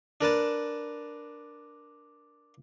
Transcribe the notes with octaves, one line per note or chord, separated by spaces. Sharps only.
D4 A#4 B4 A5